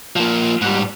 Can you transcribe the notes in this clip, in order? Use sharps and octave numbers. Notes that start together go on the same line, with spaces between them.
F3 A#3
G#2 G3